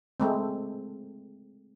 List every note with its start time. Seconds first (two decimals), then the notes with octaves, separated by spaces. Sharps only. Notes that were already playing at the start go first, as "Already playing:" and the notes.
0.20 G#3 A3 C4